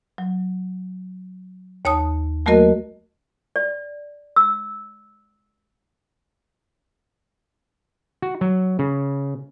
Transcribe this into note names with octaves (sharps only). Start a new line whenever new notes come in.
F#3
D#2 C#5 A5 D#6
F#3 A3 A#3 F#4 A#4 D#5
D5
E6
F#4
F#3
C#3